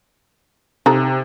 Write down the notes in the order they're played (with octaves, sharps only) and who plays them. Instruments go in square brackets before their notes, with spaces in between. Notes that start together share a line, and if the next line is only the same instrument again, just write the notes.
[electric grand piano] C3 [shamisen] D#4 A4 A#5